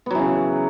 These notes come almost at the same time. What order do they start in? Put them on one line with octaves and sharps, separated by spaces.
B3 F#3 E3 C#3